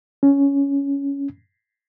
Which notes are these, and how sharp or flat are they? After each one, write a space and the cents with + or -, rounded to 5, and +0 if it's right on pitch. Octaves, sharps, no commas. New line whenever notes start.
C#4 +10